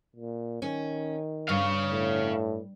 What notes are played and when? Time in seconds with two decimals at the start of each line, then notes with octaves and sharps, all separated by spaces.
0.16 A#2
0.62 D#3 C#4
1.49 G2 C#5 F5
1.91 A2